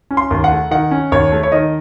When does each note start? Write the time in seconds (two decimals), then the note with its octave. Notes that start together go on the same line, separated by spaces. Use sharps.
0.11 C#4
0.17 C6
0.31 D#2
0.44 F#5
0.52 A3
0.71 D#3 F#5
0.91 C#4
1.12 D#2 C#5
1.32 A3
1.43 C#5
1.52 D#3 D#5